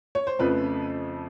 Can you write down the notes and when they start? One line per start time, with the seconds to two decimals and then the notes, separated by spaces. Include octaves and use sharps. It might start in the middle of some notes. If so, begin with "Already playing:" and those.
0.15 C#5
0.27 C5
0.39 F2 C#3 F3 A3 C4 B4